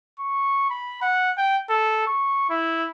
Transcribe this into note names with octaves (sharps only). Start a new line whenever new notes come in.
C#6
B5
F#5
G5
A4
C#6
E4